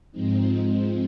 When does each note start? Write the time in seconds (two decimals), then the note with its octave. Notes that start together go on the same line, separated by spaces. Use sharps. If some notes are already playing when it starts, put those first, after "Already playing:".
0.12 G#2 F3 G#3 C4 D#4
0.55 C4